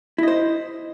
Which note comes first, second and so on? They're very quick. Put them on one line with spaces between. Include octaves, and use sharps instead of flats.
E4 D#5 C5